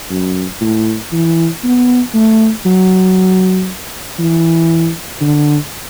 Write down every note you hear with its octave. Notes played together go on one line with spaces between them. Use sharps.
F#2
A2
E3
B3
A3
F#3
E3
D3